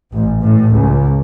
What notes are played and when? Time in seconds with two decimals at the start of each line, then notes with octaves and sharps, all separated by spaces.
0.12 A1
0.41 A2
0.74 C#2